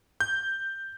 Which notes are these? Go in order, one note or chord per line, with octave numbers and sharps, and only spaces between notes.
G6